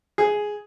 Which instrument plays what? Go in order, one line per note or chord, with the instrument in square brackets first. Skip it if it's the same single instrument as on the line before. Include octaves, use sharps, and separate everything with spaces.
[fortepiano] G#4